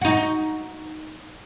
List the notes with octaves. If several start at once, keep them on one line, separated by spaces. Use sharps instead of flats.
D#4 F#4